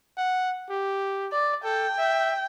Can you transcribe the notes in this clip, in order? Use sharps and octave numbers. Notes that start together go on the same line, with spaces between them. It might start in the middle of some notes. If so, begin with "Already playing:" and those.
F#5
G4
D5
A4 G5
E5